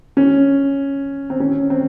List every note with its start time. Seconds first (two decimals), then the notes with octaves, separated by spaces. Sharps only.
0.17 C#4
1.30 C4
1.40 C#4
1.70 C4